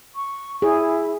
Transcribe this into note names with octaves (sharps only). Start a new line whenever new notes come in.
C#6
E4 G#4